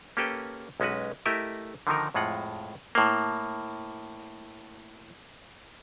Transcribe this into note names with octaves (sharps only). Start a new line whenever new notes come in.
A#3 C#4 G4 A4 B4 G5
B1 G#3 C#4 F#4 B4
A3 E4 G4 A#4 D#5 E5
D3 D#3 F3 D#4 A#4
F2 A2 G#3 F4 F#5
A2 A#3